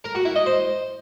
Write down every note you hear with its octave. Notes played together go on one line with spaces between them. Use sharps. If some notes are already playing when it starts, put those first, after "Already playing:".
A#4
F#4
E4
D#5
C5